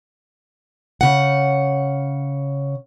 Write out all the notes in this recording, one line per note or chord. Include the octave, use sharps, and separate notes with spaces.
C#3 F#5